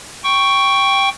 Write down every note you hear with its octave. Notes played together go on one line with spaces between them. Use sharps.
G5 C#6